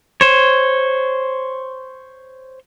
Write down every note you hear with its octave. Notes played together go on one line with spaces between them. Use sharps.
C5 C#5